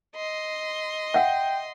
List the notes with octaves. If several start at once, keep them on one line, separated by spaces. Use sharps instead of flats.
D#5 C6
E5 F#5 G5